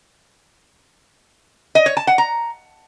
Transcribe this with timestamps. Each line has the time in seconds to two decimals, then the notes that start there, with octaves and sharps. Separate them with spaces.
1.75 D#5
1.86 C#5
1.97 A5
2.07 F#5
2.18 A#5